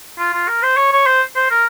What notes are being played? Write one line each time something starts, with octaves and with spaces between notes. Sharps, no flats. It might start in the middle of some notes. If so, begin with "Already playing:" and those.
F4
F4
A#4
C5
C#5
C#5
C5
C5
A#4